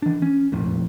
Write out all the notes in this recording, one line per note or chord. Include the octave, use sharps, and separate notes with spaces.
E3 D4
C#4
E1 A#1 F2 A2